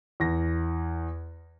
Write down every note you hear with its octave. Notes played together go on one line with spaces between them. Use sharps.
E2 A#6